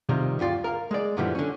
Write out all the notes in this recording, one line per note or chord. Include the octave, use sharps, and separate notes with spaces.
C3 D#3 F3 G3
D2 G2 F4 D5
A#4 F5
G#3 D5
F#2 A#2 D3 E3 F3 G3
D3 C#4